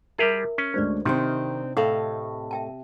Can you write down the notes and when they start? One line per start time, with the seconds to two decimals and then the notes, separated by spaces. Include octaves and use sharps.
0.18 G3 E4 G4 G#4 A#4 E5
0.58 C#4
0.74 D2 G#3 D4 C5 D5
1.05 C3 D#3 C4 D4 D#4 C6
1.77 A2 A4 D#5 F5
2.51 E5 G5 A5